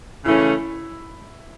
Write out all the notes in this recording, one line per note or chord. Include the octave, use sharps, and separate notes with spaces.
C#3 E3 A3 C#4 E4